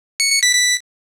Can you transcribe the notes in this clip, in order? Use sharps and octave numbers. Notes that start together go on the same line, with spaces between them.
C#7
C#7
B6
B6